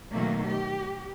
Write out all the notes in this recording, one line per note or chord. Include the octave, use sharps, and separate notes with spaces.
B2 D#3 F#3 A3 A#3
G4